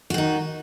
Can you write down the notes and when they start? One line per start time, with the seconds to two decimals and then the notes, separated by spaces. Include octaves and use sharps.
0.10 F#4
0.14 D#3
0.18 D#4